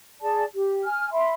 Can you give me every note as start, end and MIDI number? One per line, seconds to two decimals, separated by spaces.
0.21 0.44 68
0.21 0.44 74
0.21 0.44 81
0.54 0.84 67
0.85 1.09 80
0.85 1.09 89
1.12 1.34 76
1.12 1.34 83
1.12 1.34 84